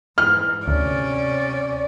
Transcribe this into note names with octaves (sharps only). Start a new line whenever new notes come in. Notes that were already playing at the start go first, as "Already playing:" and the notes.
G#2 E3 F6
D2 C3 C#4 D5